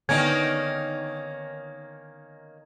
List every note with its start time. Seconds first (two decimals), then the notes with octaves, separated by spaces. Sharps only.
0.09 D3 D#3 A#3 B3 C#4 D5 G#6